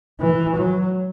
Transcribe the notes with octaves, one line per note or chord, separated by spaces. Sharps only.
E3
F#3